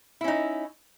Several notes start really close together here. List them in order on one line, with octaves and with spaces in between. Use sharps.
E4 C#4 D#4